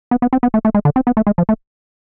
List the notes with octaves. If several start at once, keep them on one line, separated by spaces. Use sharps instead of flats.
B3
B3
C4
B3
A3
A3
G#3
D3
C4
B3
A3
G#3
F3
A3